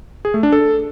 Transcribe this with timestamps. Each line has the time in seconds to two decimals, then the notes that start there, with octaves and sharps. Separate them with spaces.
0.25 G#4
0.34 A3
0.43 D4
0.52 A4